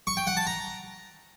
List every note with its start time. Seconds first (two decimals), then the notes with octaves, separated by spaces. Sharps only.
0.07 C#6
0.17 G5
0.27 F#5
0.37 A5
0.47 A#5